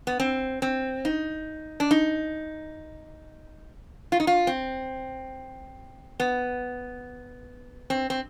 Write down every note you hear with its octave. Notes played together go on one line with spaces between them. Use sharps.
B3
C4
C4
D#4
D4
D#4
F4
D#4
F4
C4
B3
C4
C4